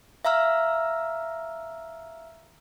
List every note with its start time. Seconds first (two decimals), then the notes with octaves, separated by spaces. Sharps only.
0.25 E5 F5 A#5 E6 F6